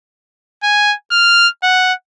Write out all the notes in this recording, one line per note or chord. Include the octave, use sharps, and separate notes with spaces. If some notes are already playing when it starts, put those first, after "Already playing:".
G#5
F6
F#5